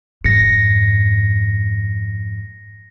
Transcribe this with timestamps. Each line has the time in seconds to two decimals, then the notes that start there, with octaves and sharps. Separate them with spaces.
0.24 F2 G#2 A#6 C#7